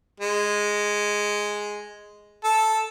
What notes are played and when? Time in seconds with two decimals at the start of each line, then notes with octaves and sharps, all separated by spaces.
0.20 G#3
2.44 A4